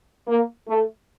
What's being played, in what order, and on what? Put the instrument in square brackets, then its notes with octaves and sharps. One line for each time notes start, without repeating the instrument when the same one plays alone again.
[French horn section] A#3
A3